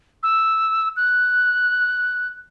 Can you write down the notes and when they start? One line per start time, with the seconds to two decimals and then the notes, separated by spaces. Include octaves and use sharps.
0.23 E6
0.96 F#6